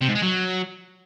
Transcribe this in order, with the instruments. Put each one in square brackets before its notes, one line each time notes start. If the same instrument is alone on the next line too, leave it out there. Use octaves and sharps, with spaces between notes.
[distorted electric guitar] C3
G#2
G#3
F#3